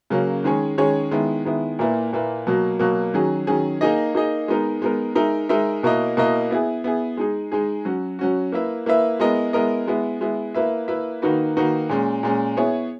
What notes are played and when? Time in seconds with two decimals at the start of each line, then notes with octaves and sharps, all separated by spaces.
0.10 C#3 F#3 A#3 C#4
0.44 D#3 G#3 C#4 G#4 C#5
0.78 D#3 G#3 C#4 G#4 C#5
1.11 D#3 G#3 B3 E4
1.45 D#3 G#3 B3 E4
1.79 A#2 A#3 E4 B4
2.12 A#2 A#3 E4 B4
2.47 B2 F#3 A#3
2.79 B2 F#3 A#3
3.14 D#3 F#3 C#4 G#4
3.47 D#3 F#3 C#4 G#4
3.81 A#3 D#4 G#4 D#5
4.15 A#3 D#4 G#4 D#5
4.48 G#3 B3 D#4 A#4
4.82 G#3 B3 D#4 A#4
5.15 G#3 D#4 A#4 E5
5.49 G#3 D#4 A#4 E5
5.83 B2 A#3 E4 A#4 D#5
6.17 B2 A#3 E4 A#4 D#5
6.50 B3 E4 G#4
6.84 B3 E4 G#4
7.17 G#3 D#4 G#4
7.52 G#3 D#4 G#4
7.85 F#3 C#4 F#4
8.19 F#3 C#4 F#4
8.52 A#3 E4 B4 E5
8.86 A#3 E4 B4 E5
9.20 G#3 B3 E4 A#4 D#5
9.53 G#3 B3 E4 A#4 D#5
9.87 G#3 B3 E4
10.21 G#3 B3 E4
10.55 A#3 E4 B4 E5
10.88 A#3 E4 B4 E5
11.22 D#3 A#3 D#4 F#4 B4
11.56 D#3 A#3 D#4 F#4 B4
11.89 A#2 G#3 C#4
12.23 A#2 G#3 C#4
12.57 B3 E4 G#4 C#5